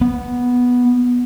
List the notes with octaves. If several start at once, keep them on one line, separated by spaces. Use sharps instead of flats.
B3